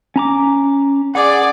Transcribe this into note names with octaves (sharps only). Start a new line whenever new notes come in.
C#4 A#5 D6
G#4 D5 F#5